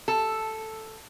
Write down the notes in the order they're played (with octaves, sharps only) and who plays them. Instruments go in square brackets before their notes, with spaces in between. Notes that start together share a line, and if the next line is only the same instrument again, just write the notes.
[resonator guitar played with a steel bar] A4